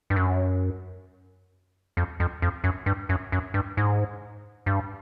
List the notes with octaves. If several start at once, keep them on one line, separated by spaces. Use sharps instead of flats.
G2
F#2
F2
F2
F2
F#2
G2
F#2
F#2
G2
G#2
G2